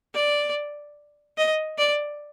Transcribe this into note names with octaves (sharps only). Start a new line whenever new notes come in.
D5
D#5
D5